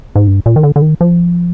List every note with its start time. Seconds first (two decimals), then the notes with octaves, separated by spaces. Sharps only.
0.16 G#2
0.27 G2
0.46 A#2
0.56 D#3
0.63 D3
0.76 D3
0.82 D#3
1.01 F3